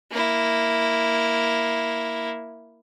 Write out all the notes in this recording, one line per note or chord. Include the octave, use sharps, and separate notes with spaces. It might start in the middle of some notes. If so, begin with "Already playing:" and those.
A#3 E4